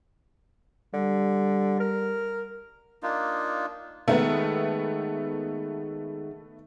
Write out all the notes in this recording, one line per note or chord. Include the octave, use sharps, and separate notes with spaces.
D3 G3
A#4
A#3 D4 D#4 F4
D#3 G#3 A3 B3